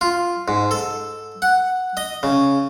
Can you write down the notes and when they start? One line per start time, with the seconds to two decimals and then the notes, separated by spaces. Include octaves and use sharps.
0.01 F4
0.48 G#2
0.71 A4
1.42 F#5
1.97 D#5
2.23 C#3